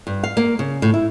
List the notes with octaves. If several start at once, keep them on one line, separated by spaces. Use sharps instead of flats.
G2
F5
A#3
C#3
A2
E4